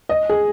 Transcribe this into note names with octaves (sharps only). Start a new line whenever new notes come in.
D#5
G#4